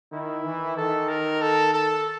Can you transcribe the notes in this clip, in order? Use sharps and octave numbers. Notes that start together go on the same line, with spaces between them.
D#3 E4
E3
D#3 A4
A#4
A4
A4